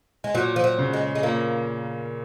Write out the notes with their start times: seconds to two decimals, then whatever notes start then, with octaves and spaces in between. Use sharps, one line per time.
0.24 G#3
0.34 A#2 F#3
0.56 F3
0.64 F#3
0.78 C#3
0.93 G#3
1.15 G#3
1.23 A#2 A#3